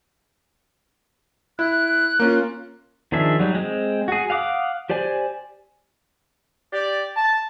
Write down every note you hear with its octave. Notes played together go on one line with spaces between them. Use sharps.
E4 F#6
A#3 C#4 F4
D#3 F3 D4 G#4 E5
F#3 G3 D#4
G#3 C4
F#4 G#4
F5 F#5 D6 D#6
G4 C5 D5 G#5
G4 D5
A5